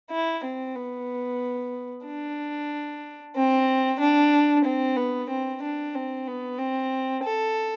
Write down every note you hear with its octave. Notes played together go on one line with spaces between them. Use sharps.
E4
C4
B3
D4
C4
D4
C4
B3
C4
D4
C4
B3
C4
A4